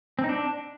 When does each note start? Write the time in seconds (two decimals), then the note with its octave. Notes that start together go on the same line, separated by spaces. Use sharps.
0.19 C4
0.24 D#4
0.29 D4